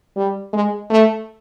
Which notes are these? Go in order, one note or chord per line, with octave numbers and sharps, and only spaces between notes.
G3
G#3
A3